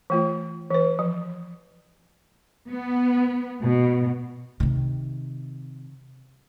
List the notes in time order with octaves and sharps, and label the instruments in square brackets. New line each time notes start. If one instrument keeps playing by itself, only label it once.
[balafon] E3 A3 F4
E3 B4
F3
[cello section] B3
B2
[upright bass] C3 D#3